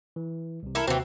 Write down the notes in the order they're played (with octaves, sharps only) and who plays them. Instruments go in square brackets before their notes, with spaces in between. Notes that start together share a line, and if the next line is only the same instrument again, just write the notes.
[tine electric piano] E3
C2 C3
[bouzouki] E4 A4 A#4
[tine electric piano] D#2 C3 F#4 [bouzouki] E3 C4